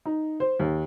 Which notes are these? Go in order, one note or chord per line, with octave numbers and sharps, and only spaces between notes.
D#4
C5
D#2